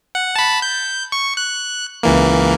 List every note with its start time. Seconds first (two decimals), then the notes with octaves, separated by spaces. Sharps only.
0.15 F#5
0.36 A5 B5
0.62 G6
1.12 C#6
1.37 F#6
2.03 C#2 E3 A#3